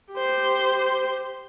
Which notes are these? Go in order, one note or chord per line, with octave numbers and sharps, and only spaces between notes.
G4 C5